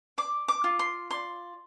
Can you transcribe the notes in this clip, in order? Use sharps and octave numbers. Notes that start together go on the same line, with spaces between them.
D5 D6
D6
F4
C6
D5 C6